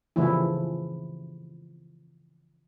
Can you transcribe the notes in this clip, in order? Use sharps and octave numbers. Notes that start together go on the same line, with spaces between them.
C#3 E3 F3 A3 E4